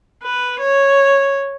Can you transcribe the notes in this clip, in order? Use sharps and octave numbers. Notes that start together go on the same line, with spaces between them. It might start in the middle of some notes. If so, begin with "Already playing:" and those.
B4
C#5